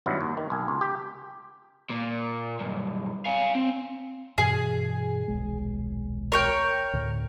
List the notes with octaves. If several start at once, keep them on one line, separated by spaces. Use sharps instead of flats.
G#1 G2 F#3 E4
D#2
D#3
B1 G#5
C#2
G4
A#2
B1 G2
F5 G#5
C4
G2 B2 E3 G#4
D#1 B1 G#3
A#4 C#5 G5
D2 A2